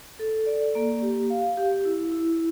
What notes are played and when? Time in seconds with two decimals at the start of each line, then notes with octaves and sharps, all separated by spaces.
0.19 A4
0.46 D5
0.75 A#3
1.02 G4
1.30 F5
1.57 G4
1.85 E4
2.12 E4